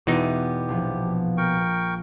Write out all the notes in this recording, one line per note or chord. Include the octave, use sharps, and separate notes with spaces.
E2 B2 E3 B3 D#4 G4
A#1 F3
A#4 G5 C#6